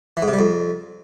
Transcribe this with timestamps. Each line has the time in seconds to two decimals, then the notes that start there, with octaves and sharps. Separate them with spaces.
0.17 E3
0.22 G#2
0.28 C3
0.33 G3
0.39 F2